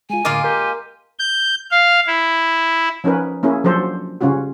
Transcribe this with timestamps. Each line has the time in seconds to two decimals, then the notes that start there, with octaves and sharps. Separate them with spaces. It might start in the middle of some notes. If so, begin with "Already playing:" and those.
0.10 G#3 F4 G#5
0.25 A2 D3 G#3 A#3 F4 A#4 D6
0.44 G4 A#4
1.19 G6
1.71 F5
2.07 E4
3.04 F3 C#4 D#4 A#4 B4
3.43 A#3 C#4 E4 G#4
3.64 F3 F#3 D4 A4 C5
4.21 C#3 G3 C#4 F4 F#4